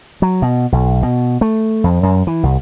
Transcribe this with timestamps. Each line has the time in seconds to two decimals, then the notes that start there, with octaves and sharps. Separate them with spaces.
0.22 F#3
0.42 B2
0.72 B1
1.03 B2
1.41 A3
1.84 F2
2.03 F#2
2.27 E3
2.43 C2